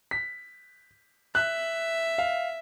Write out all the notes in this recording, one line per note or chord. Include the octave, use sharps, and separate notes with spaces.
B6
E5 F#6
F5